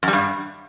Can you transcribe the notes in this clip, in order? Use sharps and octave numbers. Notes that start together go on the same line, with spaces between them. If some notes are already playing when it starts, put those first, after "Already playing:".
F#2
G3
G2